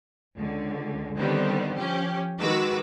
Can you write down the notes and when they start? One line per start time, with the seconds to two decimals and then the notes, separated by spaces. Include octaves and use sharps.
0.36 C#2 D3
1.17 D3 D#3 G3 B3 C4
1.78 F3 C#4 G4
2.40 D#3 G#3 F#4 B4 D6 E6